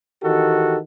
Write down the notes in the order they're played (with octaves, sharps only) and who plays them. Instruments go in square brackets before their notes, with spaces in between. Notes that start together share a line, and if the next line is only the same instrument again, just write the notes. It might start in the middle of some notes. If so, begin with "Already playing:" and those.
[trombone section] D#3 E3 F#4 G4 A4